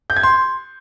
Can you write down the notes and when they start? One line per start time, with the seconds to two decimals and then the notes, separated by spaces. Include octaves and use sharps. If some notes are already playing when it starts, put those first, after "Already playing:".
0.10 G6
0.16 G#6
0.23 C6